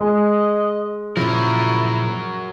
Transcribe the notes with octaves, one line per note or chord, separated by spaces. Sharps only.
G#3 D#5
A#2 C#3 F3 F#3 E4 A#4